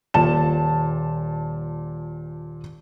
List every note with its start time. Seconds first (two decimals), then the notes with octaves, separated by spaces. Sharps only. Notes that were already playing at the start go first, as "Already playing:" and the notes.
0.14 D#1 A#2 A5 E7